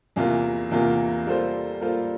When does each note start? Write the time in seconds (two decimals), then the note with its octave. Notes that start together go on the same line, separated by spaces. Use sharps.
0.16 E2 C3 E3 A#3 F4
0.71 E2 C3 E3 A#3 F4
1.27 G3 A#3 F4 A4 C5
1.81 G3 A#3 F4 A4 C5